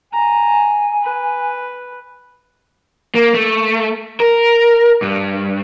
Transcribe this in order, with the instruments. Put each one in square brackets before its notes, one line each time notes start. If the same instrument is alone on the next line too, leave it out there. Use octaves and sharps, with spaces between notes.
[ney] G#5 [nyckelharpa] A#5
[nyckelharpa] B4
[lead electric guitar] A#3
A3
A#4
G2